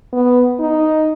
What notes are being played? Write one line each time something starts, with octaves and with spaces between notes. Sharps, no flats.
B3
D#4